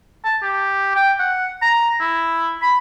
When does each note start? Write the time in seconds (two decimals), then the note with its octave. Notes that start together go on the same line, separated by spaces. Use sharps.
0.25 A5
0.43 G4
0.96 G5
1.20 F#5
1.62 A#5
2.01 E4
2.62 B5